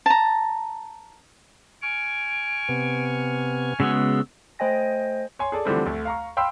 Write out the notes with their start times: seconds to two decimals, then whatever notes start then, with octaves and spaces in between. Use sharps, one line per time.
0.06 A5 A#5
1.82 G#5 C#6 F6 D7
2.69 C3 B3
3.80 C#3 G#3 B3 F#4 E6
4.59 A3 C5 D#5 G5 G#5 A#6
5.39 C#5 G#5 C6
5.52 G#4 A4 D5
5.65 D3 E3 F3 G3 A3 C4
5.86 D2 A3
6.05 F5 A#5 C#6
6.37 F5 G5 B5 C6 E6